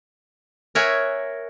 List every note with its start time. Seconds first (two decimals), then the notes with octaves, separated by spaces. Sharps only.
0.75 A#4 C#5 E5 F#5 G#5